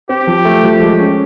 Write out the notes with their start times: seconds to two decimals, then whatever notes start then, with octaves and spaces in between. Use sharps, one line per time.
0.09 C4 G4
0.27 F3
0.45 A3
0.63 F3
0.81 G#3
0.99 C#4